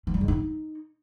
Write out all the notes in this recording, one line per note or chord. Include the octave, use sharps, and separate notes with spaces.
E3
G3
C#3
D#4